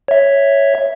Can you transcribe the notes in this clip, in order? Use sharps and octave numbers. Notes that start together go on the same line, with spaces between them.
C#5 E5